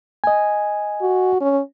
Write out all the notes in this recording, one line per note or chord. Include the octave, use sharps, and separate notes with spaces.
D#5 G#5
F#4
C#4